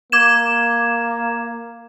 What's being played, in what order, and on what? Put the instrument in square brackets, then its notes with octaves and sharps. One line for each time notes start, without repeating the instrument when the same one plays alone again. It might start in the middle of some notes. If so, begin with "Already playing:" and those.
[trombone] A#3 [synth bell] D6 G#6 E7